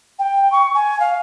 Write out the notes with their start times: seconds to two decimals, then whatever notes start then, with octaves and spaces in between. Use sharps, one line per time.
0.19 G5
0.52 C#6
0.74 G#5
1.00 F5